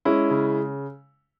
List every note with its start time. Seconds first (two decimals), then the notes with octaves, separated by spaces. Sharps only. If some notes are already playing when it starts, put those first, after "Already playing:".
0.05 G#3 C#4 E4
0.30 C#3